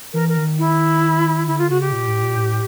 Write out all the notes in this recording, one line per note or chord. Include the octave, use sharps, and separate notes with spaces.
E3 A#4
A#4
D#3
E4
D3 E4
F4
C#3 F#4
G4
A#2
A2
A#2
A2